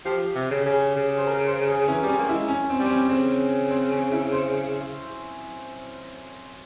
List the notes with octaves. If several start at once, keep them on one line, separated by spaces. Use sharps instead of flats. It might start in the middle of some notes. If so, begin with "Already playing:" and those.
F3 G4
C3
C#3
C#3 G#4
C#3
C5
A#4
C5
G#4
E3 C#4
G3
C#4
A#3
G#3 E4
C#4
C4
G3
C4
C#4
C#3 C4
C4
C#4
E4
C5